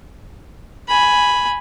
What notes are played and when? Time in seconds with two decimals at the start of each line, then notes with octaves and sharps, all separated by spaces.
0.88 G#5 B5